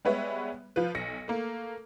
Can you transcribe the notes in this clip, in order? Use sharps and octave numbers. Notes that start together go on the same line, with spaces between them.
G3 G#3 B3 B4 C#5 E5
F3 F4 B4
B1 A#6 C#7
A3 A#3